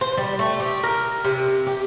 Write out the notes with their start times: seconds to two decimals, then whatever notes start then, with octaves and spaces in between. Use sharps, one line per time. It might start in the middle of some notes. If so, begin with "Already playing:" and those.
0.01 C5
0.18 G3
0.39 A3
0.60 G4
0.83 A#4
1.24 C3
1.67 G4